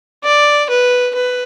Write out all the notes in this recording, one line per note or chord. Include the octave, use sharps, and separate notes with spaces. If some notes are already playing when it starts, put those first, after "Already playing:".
D5
B4
B4